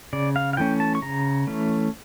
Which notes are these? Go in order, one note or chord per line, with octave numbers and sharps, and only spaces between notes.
C#3 D5
F5
F5
E3 A3 C#4 G5
A5
C#6
C#3 A#5
E3 A3 C#4